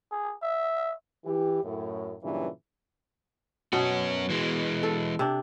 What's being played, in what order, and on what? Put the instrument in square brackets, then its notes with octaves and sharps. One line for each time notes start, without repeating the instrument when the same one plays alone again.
[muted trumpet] G#4
E5
[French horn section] E3 G4
F#2 A2
G2 A#2 C#3 E3 F#3
[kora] B2 [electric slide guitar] F#3 C#4 F#4
[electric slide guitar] E3 G#3
[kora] A4
C3 D4